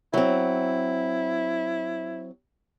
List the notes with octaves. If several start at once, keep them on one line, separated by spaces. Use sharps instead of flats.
F#3 C4 E4